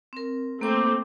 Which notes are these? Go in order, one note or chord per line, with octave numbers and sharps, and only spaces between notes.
C4 A#4
A3 A#3 C4 D6